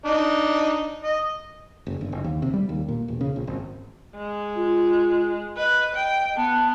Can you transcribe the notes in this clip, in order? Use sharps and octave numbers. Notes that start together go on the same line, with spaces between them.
D4 D#4
D#5
F#1
G1
F#1
D#2
C3
G3
D#2
A#2
E1
C#3
A#1
G#1
G#3
F4
B4 D#5
G5
B3 A5